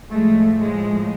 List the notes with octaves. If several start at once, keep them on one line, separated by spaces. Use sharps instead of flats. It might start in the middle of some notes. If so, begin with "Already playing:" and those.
A2 F3 G#3 A3
G#3